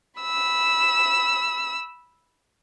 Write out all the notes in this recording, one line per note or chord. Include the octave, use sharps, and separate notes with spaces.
B5 E6